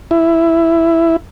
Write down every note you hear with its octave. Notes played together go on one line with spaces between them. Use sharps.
E4